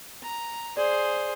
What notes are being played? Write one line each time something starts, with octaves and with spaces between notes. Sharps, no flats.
A#5
G#4 C5 D5